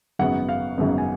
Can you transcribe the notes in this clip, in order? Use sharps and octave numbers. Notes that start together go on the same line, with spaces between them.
G#1 F#2 C#3 F#3 B3 F#5
F5
G#1 F#2 C#3 F#3 B3
G#5